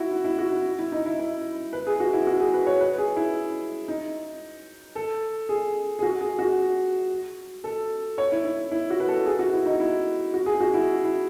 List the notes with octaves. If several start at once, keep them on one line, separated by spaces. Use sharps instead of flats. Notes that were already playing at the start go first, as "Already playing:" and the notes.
Already playing: E4 F#4
E4
E4
F#4
E4
E4
D#4
E4
E4
B4
G#4
F#4
E4
F#4
G#4
B4
C#5
B4
G#4
E4
D#4
A4
G#4
G#4
F#4
G#4
F#4
A4
C#5
E4
E4
E4
F#4
B4
A4
G#4
F#4
E4
D#4
E4
F#4
G#4
F#4
E4
E4